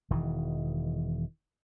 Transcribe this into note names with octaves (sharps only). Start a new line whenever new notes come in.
E1 D#3 E3